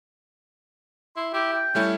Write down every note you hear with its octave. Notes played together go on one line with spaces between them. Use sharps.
E4 C6
E4 G4
G5
G3 A3 C#4 E4